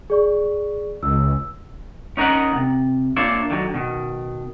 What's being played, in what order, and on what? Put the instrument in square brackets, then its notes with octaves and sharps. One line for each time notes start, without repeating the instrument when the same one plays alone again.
[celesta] G#4 D5 C#6
[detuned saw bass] C#2 [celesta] E6
[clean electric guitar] C#4 D#4 A#4 D#5 F#5
D#2 C3
A#3 D4 F4 C#5 E5
D3 D#3 F#3
B2 D#3